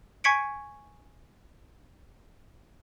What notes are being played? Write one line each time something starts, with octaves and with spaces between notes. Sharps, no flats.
G#5 C#6 G#6 B6 C#7 D7